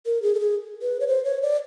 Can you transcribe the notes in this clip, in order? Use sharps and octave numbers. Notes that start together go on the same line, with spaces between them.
A#4
G#4
A4
G#4
B4
C#5
C5
C#5
D5